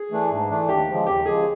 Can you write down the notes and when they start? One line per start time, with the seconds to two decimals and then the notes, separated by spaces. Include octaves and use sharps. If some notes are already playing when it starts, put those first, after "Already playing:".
Already playing: G#4
0.11 E3 A3 D4
0.30 G#2
0.49 E3 A3 D4
0.68 D#2 G4
0.88 C#3 F3 G#3
1.07 D#2 G4
1.26 C#3 F3 G#3 G#4